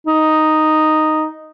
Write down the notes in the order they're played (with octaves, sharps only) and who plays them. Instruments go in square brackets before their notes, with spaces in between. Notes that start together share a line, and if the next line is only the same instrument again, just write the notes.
[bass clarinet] D#4